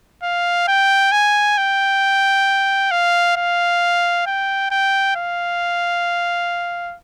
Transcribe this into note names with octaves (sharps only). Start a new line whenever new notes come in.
F5
G5
G#5
G5
F5
F5
G5
G5
F5